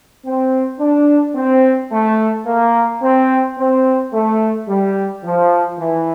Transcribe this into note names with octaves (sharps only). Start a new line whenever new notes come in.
C4
D4
C4
A3
A#3
C4
C4
A3
G3
F3
E3